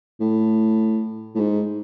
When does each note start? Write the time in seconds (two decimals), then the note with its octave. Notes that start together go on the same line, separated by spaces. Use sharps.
0.20 A2
1.35 A2
1.39 G#2